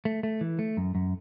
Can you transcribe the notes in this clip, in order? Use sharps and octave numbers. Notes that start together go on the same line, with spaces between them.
A3
A3
E3
A3
F#2
F#2